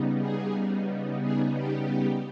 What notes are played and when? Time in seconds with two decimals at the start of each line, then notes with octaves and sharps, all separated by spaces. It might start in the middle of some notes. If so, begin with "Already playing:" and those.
Already playing: C#3 G3 B3 D#4
0.20 G#4
1.23 G#4
1.57 G4